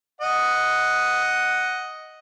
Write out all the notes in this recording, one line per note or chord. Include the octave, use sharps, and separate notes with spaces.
D#5 F#5